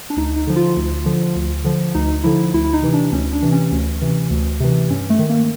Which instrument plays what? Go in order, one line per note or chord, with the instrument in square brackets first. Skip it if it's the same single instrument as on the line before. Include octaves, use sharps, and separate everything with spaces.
[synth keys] D4
D2 D#4
D#4
D3 F3
F4
D2
D3 F3
D2
D3 F3
D2 D#4
D3 F3 E4
D2 E4
E4
D#4
C3 E3
D4
D2 C#4
D4
C3 E3
C#4
D2
C3 E3
D2
C3 E3
G2 C#4
A3
D#3
A#3